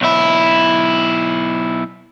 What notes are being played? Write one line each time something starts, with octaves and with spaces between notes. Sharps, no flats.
B1 E4